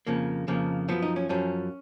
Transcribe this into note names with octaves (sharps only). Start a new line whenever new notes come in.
F2 C#3 F3 A#3
F2 C#3 F3 A#3
F#2 F3 B3
D#4
C#4
F#2 F3 C#4